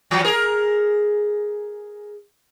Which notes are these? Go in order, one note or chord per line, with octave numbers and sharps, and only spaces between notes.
E3 F#3
G#4 A#4